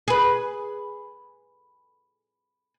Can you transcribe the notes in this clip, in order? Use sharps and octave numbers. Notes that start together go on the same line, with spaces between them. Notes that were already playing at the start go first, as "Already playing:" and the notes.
G#4 B4